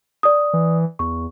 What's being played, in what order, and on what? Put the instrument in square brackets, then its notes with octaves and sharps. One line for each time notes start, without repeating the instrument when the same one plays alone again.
[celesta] D5 D#6
[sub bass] E3
[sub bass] E2 [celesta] C#6